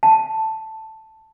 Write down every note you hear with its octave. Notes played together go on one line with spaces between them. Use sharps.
A5